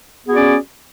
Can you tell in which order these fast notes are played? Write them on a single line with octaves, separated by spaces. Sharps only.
B3 G#4 F#4 D5 C#4